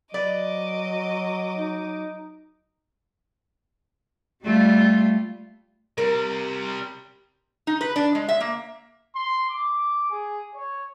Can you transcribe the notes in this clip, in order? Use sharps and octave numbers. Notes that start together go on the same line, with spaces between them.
F#3 B4 D5 D#5 D6
D#4
G3 A3 F4
C3 G3 A#4
D#4
B4
D4
G#3
E5
A#3
C6
D6
G#4
C#5